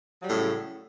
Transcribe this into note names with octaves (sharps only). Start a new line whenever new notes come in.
A2 C#3 F#3 G3